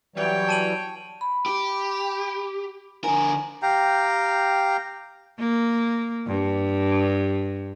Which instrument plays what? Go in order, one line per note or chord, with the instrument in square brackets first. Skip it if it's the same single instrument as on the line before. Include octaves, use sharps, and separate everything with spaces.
[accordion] E3 F#3 G3 [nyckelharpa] C#5 G5
[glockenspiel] A5 D#7 F#7
[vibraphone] B5
[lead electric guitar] G4
[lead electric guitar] D3 A#4 [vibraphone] G#5
[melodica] G4 F5 G5 A#5
[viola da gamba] A#3
G2